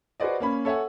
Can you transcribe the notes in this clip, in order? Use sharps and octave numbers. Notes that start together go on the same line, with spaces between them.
F#4 G#4 B4 C5 D5 D#5
A#3 C#4 B5
A4 C#5 E5 F#5 G#5